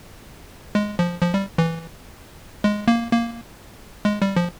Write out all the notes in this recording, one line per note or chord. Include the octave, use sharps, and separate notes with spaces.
G#3
F3
F3
G3
E3
G#3
A#3
A#3
G#3
G3
F3